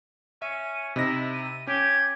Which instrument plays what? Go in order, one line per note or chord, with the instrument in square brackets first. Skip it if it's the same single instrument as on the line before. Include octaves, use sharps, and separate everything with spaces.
[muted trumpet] C#4 [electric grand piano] E5 [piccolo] D#7
[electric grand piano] C3 D#4 A#6 [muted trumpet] E4 [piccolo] D#5
[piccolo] D#7
[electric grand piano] C#4 [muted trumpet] G4 [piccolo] G#6